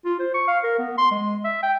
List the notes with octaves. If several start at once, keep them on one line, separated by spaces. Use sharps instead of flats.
F4
C5
C#6
F5
A#4
B3
C6
G#3
E5
G5